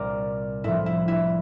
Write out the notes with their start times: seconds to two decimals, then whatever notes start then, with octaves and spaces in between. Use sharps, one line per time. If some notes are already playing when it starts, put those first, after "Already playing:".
Already playing: C2 A#2 G3 A#4 D5
0.64 A2 F3 E4
0.86 E4
1.08 E4